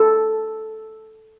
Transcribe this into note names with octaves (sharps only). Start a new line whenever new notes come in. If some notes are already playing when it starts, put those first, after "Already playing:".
Already playing: A4